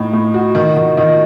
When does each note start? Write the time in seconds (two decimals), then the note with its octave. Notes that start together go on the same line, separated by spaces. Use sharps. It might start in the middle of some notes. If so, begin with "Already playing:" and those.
Already playing: A2 D#4
0.13 A2
0.34 F#4
0.55 D#3
0.76 D#3
0.97 D#3